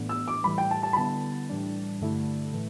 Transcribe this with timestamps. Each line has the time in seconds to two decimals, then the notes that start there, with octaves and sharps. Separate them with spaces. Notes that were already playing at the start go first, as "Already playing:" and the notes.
Already playing: A2 E3 B3 D4
0.09 E6
0.28 D6
0.44 A2 E3 G3 B5
0.58 G5
0.71 A5
0.83 A5
0.93 B5
0.97 D3 G3 B3 E4 A5
1.49 A2 E3 G3 D4
2.01 G2 D3 A3 E4
2.53 A2 E3 A3